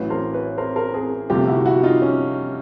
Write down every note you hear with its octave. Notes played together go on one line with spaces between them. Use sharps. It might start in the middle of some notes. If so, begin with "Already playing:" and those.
Already playing: A1 A2 F#3 B4 C#5
A#4 C5
B4 C#5
A#4 C5
A#4 C5
G#4 A#4
G1 F2 C3 F3 A3 F4 G4
E4 F#4
E4 F#4
D#4 F4
C#4